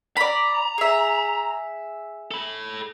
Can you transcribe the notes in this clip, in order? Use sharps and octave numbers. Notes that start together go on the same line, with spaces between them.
D5 A#5 B5
G#4 E5
A4 B5